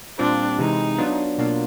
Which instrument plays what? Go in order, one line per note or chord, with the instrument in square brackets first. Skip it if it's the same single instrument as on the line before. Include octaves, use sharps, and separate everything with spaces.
[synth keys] A#2 G3 C4 F4 [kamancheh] D4
[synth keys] C3 E3 G#3 [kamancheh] D#4
[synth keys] F#3 B3 D4 F4
B2 F#3 A#3 D4 F4